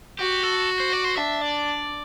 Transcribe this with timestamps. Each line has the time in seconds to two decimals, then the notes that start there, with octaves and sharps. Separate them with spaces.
0.19 F#4 G4
0.43 A4
0.80 C5
0.92 D5
1.04 C5
1.17 D4 E5
1.41 D5